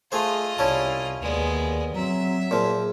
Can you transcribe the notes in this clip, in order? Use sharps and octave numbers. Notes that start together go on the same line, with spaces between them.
A3 F4 G#4 C5 D#5
C2 C#4 E4 G4 D5 A5
D#2 G#3 B3 B4 D5
F#3 C4 E5 A#5
A#2 F3 G#4